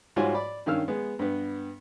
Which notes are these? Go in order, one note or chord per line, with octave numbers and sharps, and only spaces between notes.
G#2 G3 F4 F#4 C#5 G#5
D5 B5
G2 D#3 C#4 F5 E6 F6
G#3 B3
G2 B3